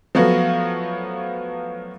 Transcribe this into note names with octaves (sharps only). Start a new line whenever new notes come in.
F3 F#3 A3 B3 F4 F#4